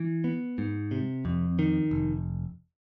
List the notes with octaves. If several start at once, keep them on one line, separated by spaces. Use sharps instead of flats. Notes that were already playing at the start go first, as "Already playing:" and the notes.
Already playing: E3
B3
G#2
C3
F2
D#3
F1